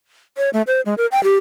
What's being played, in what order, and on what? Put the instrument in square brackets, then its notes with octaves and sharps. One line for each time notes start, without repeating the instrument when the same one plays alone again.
[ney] C#5
A3
C5
G#3
A#4
G5
G4